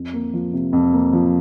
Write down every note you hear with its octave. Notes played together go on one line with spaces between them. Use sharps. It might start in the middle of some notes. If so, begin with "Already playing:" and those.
Already playing: F2
A#3
F3
C3
F2
A#3
F3